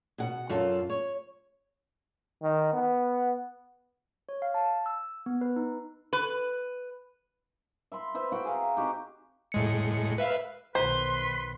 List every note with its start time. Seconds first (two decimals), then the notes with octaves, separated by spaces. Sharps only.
0.18 B2 F#5
0.49 F#2 F4 A4
0.90 C#5
2.43 D#3
2.73 B3
4.29 C#5
4.42 F5
4.54 A5
4.86 E6
5.26 B3
5.41 B4
5.56 D#4
6.13 B4
7.92 E5 B5 C6
8.14 B4 C5 E5
8.32 F#4 F#5 G5 C#6
8.45 G#4 F5 A#5
8.77 C4 D#4 F#4 G4
9.52 A2 G#3 C#7
10.18 B4 E5 F5
10.75 B1 D#3 B4 C5 C6